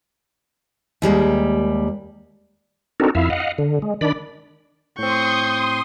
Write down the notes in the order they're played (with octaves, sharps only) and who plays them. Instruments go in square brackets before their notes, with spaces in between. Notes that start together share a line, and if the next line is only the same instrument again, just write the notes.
[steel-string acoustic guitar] D#2 G3 G#3 A#3
[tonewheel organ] C4 D4 D#4 F#4 A4 A#4
F2 E4 E5 F5
D#5 F5 F#5
D3
G#3
D#3 D4 D5 B5
[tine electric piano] A2 C4 [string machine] C6 D#6 [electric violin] C#6 G6